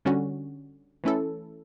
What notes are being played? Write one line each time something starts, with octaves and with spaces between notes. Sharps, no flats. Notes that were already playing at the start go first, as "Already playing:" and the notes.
D3 G3 C#4 F#4
E3 A3 C#4 E4 A4